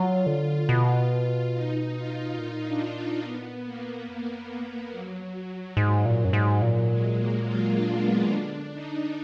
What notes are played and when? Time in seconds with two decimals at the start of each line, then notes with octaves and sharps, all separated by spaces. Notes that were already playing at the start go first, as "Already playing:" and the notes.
Already playing: F#3 F4
0.26 D3 F4
0.69 B2
1.54 D#4
1.96 F4
2.38 A#2 D#4
2.67 D4
2.95 D4
3.23 B3
3.65 A#3
4.08 F#2
4.92 F#3
5.34 F#3
5.69 A#2
5.77 G#2
6.05 A#2
6.25 F#2
6.33 G#2
6.62 A#2 F#3
6.90 G#3
7.17 A#3
7.46 F4
7.75 D4
8.03 B3
8.24 D#3
8.30 D3 D4
8.74 D#4